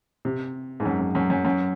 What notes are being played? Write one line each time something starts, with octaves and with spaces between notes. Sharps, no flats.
C3
G#2
F#2
F#2
F#2
F#2
F#2